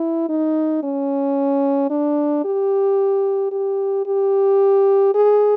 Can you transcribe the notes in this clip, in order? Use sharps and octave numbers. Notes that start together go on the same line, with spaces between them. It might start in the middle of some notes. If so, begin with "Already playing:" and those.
Already playing: E4
D#4
C#4
D4
G4
G4
G4
G#4